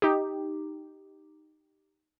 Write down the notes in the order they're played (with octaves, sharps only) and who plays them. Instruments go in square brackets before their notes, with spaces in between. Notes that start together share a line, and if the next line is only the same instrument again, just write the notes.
[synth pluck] D#4 G4